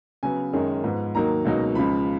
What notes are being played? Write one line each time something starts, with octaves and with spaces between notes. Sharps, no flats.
C#3 F#3 B3 G#5
F#2 D#3 G#3 C#4
G#2 F3 B3
D#2 D#3 F#3 A#3 D#4 A#5
C#2 B2 F#3 A#3 D#4
C#2 C#3 F3 B5